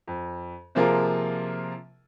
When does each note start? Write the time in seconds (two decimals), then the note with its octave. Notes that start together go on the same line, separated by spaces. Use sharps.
0.07 F2
0.75 C3 F3 A#3 F4 G#4 A#4